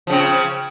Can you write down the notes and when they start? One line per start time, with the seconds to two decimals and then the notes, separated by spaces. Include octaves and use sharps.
0.07 F3
0.10 C#3
0.12 C4